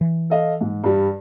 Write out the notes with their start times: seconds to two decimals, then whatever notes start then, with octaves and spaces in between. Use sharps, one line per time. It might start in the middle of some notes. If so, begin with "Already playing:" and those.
0.01 E3
0.30 A4 D#5 F5
0.61 G#2
0.84 G2 G3